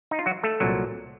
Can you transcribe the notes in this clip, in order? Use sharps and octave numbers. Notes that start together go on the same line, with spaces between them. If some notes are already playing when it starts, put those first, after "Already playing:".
D#4
F4
F#3 F#4
A3 A4
C2 A#2 F#3